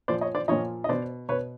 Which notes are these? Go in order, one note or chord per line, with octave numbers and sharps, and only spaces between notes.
A#2 F3 C5 D5
C#5 D#5
C5 D5
A#2 F3 C#5 D#5
D#5
B2 C5 D5
B2 B4 C#5